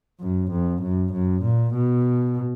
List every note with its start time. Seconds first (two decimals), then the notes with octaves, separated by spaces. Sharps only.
0.21 F#2
0.51 F2
0.82 F#2
1.13 F#2
1.43 A#2
1.74 B2